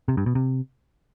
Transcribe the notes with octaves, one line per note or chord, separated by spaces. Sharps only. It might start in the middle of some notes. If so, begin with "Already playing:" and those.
C3
G2
B2
C3